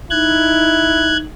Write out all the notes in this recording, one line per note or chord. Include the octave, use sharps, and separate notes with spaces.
D#4 E4 F#6 G#6